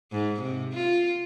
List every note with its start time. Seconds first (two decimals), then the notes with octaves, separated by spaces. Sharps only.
0.12 G#2
0.42 C3
0.74 F4